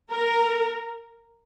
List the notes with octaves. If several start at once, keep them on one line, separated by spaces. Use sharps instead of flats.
A#4